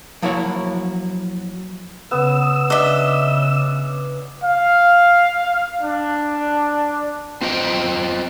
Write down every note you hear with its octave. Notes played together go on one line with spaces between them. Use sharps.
F3 F#3 A#3 E4 F#4 C#5
C#3 B3 E6
C#3 D4 D#5 E5
F5
D4
C4 F4 C5 D#5 G5